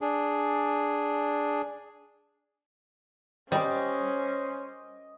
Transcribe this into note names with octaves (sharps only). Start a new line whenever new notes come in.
D4 G#4
G3 C#4 C5 D#5 D6